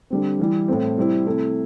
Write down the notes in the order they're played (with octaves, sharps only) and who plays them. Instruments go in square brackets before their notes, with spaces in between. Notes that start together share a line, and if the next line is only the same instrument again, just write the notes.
[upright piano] D3 G3 C4
E3 G3 E4
A2 A3 C4
C3 G3 C4 E4
C3 A3 E4